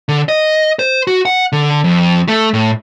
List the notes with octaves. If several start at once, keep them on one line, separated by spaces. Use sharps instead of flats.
D3
D#5
C5
F#4
F#5
D3
F2
A3
A2